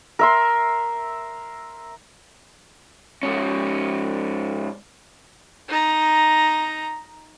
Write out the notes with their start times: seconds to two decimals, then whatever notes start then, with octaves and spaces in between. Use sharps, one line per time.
0.19 A#4 E5 C6
3.23 G#2 C#4
5.69 D#4 A#5